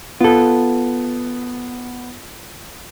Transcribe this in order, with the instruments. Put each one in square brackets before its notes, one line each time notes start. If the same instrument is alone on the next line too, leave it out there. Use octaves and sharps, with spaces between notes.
[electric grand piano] B3 [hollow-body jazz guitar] F4 A4